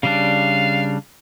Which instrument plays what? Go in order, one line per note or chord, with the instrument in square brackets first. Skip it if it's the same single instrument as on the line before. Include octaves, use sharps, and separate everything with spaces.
[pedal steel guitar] C#3 G3 D4 [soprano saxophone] F5